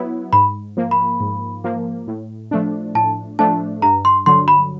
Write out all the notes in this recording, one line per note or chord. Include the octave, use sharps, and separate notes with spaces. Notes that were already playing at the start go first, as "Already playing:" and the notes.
Already playing: F#3 B3 E4
G#2 B5
F3 A#3
B5
G#2
F3 A#3
A2
F3 A3 D4
A2 A5
F3 A3 D4 A5
G2 A#5
C6
D3 F#3 C6
B5